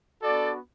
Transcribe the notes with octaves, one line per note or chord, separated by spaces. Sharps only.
B3 D4 F#4 A4 D5